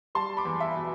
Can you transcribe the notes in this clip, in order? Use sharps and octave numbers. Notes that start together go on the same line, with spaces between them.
G3 A5 C6
B5 D6
E2
E5
B2